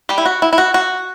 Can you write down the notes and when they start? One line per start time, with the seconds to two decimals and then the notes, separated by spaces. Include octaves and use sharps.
0.09 G3 G4
0.18 E4
0.26 F#4
0.42 E4
0.53 E4
0.58 F#4
0.74 F#4